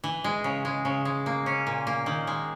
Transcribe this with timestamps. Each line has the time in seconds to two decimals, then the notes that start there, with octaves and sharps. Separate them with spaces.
0.04 E3
0.24 G#3
0.44 C#3
0.65 G#3
0.85 C#3
1.05 G#3
1.26 A#3
1.46 C#4
1.67 A#2
1.87 A#3
2.06 D#3
2.27 G#3